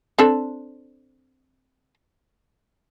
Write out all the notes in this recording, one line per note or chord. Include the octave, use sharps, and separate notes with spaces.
C4 D4 A4